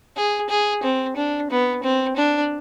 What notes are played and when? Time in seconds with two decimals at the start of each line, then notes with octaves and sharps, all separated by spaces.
0.17 G#4
0.50 G#4
0.83 C4
1.16 D4
1.50 B3
1.83 C4
2.17 D4